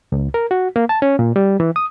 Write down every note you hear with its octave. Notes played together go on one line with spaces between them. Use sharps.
C#2
A#4
F#4
A#3
A5
C#4
A#2
G3
E3
D#6